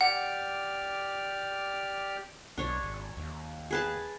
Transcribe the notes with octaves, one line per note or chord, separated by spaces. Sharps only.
G4 D5 F#5 F6
B1 D4 C#5
G#1
D#2
G#4 B4 A5